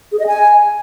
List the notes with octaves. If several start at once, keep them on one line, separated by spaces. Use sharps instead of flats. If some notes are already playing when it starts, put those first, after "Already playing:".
G#4
D#5
G#5